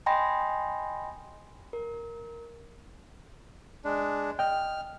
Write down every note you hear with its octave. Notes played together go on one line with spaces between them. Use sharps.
D#5 G5 G#5 B5 C6 A#6
A#4
G#3 D4
D#5 G5 F6